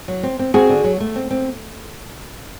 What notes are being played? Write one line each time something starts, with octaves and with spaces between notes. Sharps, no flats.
F#3
C4
C4
C4 F#4 G#4
D3
F#3
A3
C4
C4